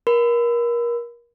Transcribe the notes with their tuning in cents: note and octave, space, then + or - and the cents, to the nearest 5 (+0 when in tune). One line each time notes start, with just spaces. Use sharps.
A#4 +30 B5 +35